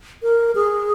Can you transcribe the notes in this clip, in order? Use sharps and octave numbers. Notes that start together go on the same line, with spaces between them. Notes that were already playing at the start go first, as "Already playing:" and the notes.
A#4
G#4